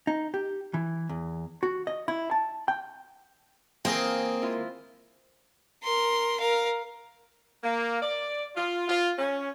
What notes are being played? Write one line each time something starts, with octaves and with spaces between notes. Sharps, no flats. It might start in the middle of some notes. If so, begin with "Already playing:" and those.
D#4
G4
E3
E2
F#4
D#5
E4
A5
G5
E3 A#3 C4 G#4 A#4 F5 G5
G#3 E4 F4
A#4 C6
A#4 F5
A#3
D5
F4
F4
C#4